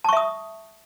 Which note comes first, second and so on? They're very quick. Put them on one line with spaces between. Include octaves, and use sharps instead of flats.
A5 C#6 E5 D#6